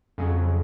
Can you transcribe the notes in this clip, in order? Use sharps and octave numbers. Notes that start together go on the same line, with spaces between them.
F2 C#3 F#3